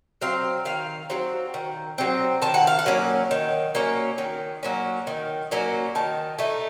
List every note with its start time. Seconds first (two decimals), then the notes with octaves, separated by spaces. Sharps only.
0.21 F#3 C4 F5
0.65 D#3 F5
1.10 F#3 C4
1.54 D#3
1.98 F#3 C4
2.42 D#3 A5
2.54 F#5
2.67 F5
2.79 F#5
2.86 F#3 A#3 C#4
3.31 D#3
3.75 F#3 A#3 C#4
4.18 D#3
4.63 F#3 A#3 C#4
5.07 D#3
5.51 F#3 A#3 C#4
5.95 D#3 A5
6.38 A3 D#4